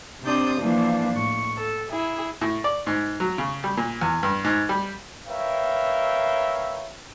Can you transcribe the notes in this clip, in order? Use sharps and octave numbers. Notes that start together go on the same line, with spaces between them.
C3 C4 D4 D5 D#6 G6
E3 F3 A#3 D4
A2 C#6
A4
E4 G#4
A2
D5
G#2
F#3
C#3
G3
A#2
E2
G2
G#2
G3
A#4 B4 C#5 E5 F5 G5